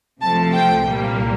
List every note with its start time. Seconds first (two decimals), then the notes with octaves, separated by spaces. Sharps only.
0.21 C2 C3 F3 A3 A5
0.52 G5
0.84 C2 A#2 G3 A#3